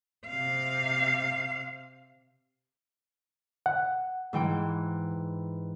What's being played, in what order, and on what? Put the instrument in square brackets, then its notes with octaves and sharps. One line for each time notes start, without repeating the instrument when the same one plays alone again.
[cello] C3 F5
[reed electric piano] F#5
[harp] G#2 E3 G5